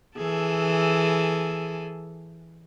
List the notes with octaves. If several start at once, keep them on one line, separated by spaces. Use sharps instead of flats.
E3 G#4 A4